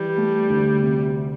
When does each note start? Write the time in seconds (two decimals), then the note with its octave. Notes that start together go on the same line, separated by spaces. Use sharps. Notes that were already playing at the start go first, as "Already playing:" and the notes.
Already playing: E3 G3
0.17 A3
0.49 D2
0.83 C3